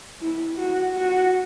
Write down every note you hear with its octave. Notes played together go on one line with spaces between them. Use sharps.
E4
F#4
F#4